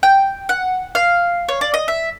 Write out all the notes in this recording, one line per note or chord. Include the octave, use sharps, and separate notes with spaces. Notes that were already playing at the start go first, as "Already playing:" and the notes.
G5
F#5
F5
C#5
D5
D#5
E5